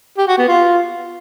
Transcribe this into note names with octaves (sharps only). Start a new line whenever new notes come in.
G4
F#4
B3
F4